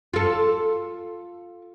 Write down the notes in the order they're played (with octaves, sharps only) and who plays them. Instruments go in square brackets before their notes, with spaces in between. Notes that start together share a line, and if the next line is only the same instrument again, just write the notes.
[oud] F4 A4